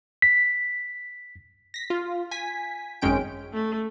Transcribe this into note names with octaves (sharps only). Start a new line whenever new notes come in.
B6
A#6 B6
F4
G#5 B6
G#1 F#2 G#3 C#4 G5 D7
A3